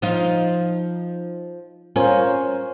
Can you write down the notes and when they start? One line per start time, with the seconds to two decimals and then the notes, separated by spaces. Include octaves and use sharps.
0.02 F3 D#4 F4
1.96 C#4 F4 A#4 C5